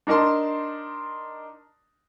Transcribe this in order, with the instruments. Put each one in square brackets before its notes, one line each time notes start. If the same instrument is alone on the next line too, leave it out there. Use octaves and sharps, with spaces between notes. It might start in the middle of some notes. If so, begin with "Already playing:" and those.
[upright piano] D4 D#4 A#4 A5 C6